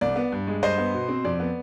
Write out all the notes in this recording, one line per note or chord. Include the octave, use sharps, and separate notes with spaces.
C2 D5
B3
G2
G#3
G2 C5 D#5
B3
B2
C4
F2 D5
B3